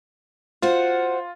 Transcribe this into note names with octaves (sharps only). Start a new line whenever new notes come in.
F4 F#4 C5 F#5